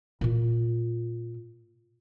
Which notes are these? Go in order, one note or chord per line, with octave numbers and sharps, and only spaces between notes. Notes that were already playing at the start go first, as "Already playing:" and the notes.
A#2 F4